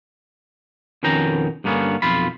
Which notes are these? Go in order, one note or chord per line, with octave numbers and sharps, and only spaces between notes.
F2 B2 D#3 C#4 G5 A#5
G2 D3 A#3 B3 C#4
B1 F2 F4 B5